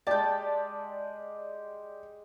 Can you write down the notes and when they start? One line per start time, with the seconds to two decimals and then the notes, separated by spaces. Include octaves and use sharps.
0.07 G#3 G4 D5 A5 G6